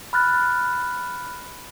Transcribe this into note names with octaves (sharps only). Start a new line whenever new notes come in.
B5 F6 F#6 A6